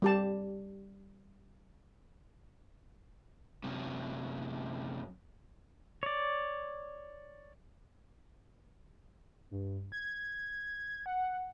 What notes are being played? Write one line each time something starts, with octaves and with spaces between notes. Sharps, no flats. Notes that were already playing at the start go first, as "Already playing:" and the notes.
G3 G4 A5
F#2 C3
C#5 D5
G2
G#6
F#5